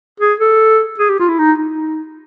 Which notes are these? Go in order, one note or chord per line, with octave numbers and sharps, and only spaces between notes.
G#4
A4
G#4
G4
F4
E4
D#4
D#4